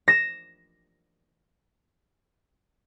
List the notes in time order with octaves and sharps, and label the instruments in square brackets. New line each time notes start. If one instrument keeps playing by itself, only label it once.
[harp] A#6 E7